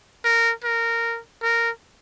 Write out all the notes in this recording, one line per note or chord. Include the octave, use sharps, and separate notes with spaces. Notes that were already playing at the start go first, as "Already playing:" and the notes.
A#4
A#4
A#4